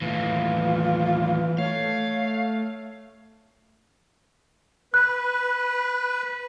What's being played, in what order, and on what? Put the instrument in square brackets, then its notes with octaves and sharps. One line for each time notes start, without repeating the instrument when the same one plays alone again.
[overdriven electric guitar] D#2 A2 [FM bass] E3 [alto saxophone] F4
[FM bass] A3 [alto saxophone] C#5 [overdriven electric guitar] F5
[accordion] B4 [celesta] F#6